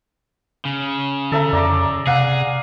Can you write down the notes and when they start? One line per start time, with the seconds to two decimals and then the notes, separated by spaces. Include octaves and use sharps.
0.65 C#3
1.32 D3 A4 E5 A#5
1.53 F2 D5 A#5 D6
2.07 C3 G#4 F5 F#5